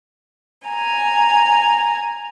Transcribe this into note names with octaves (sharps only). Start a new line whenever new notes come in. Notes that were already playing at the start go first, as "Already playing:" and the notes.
G#5 A#5